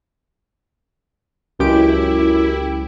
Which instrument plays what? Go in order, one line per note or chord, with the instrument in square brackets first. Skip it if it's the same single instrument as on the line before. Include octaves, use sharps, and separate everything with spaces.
[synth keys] C#2 G4 D7 [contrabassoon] F#2 [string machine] E4